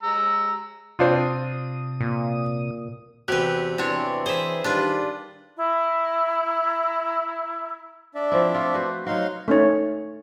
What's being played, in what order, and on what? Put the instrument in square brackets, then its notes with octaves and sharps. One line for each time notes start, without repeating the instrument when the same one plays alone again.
[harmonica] G#3 A#5 E6
[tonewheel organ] C3 D#6 [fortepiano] C4 D4 F4
[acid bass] A#2
[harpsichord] E2 C3 [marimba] F#4 [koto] G4 B4
[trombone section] E3 [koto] C4 D4 C#5
[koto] G#4 E5 [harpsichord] C5
[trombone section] D#3 G3 [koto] D4 F4 B4
[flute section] E4 A#5
[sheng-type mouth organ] D4 D5 E5
[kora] F3 C4 E4
A3 F4
F#4 B4 C5
[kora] F#3 F#4 [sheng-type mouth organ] D#4 F5 C6
[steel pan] A3 C#4 D#4 C#5